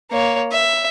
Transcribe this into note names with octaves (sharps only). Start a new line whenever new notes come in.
A#3 C#5
E5